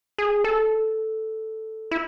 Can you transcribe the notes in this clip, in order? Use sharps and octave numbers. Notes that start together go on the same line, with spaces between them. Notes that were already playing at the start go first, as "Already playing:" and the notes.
G#4
A4
E4